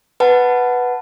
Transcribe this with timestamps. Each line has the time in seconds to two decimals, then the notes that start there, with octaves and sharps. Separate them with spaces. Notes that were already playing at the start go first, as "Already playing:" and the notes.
0.20 B4 F#5 A5